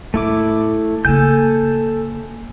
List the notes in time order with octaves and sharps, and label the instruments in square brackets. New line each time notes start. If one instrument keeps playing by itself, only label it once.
[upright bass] A2 [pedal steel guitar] A3 E4 D6
[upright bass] C#3 A#3 [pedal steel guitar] A4 G#5 G6